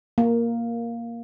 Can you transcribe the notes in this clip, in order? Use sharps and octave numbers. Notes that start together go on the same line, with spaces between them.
A#3